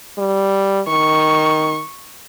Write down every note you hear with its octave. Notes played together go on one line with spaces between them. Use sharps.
G3
D#3 C#6